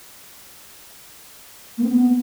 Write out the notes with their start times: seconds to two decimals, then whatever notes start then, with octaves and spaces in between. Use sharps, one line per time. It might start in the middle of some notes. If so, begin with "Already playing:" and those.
1.78 A#3
1.83 C4
1.89 B3